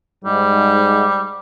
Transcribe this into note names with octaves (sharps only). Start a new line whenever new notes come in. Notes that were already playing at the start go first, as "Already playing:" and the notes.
G#2 G3